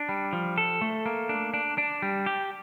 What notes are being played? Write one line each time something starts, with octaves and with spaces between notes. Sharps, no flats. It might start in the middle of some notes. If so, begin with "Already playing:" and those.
Already playing: D4
G3
F3
A4
A3
A#3
D4
D4
D4
G3
G4